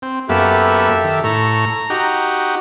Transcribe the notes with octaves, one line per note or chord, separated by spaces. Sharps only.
C4
F#2 A#3 B3 G4 A4 E5
D#3
A2 A4 A#5 C#6
D#4 F#4 G4